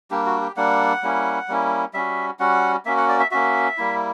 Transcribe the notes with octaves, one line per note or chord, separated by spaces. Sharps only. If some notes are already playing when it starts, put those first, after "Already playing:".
G3 A#3 D4 G4
F#4
G4
G3 A#3 D4 F#5
G3 A#3 C#4 E4
G3 A#3 C#4 E4
G3 C#4 F#4 E5
G3 C#4 F#4 F#5
A#3 C#4 F#4 E5
F#5
D5
E5
A#3 C#4 F#4 E5
G3 A#3 E4